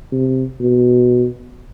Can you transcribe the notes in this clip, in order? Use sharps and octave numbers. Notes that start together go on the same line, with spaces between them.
C3
B2